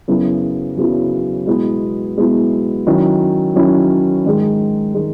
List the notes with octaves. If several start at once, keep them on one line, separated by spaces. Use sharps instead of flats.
F#2 C#3 F#3 B3 E4
F#2 C#3 F#3 B3 E4
B2 G#3 B3 E4
B2 G#3 B3 E4
D#3 F#3 C#4 E4
D#3 F#3 C#4 E4
G#2 D#3 G#3
D#3 G#3